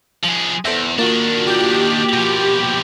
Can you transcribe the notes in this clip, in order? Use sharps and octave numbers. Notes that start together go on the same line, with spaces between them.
F3 G#4
E2 A4 C5 E5
D#3 A#3 D4 F4 F#4
G4
B2 F3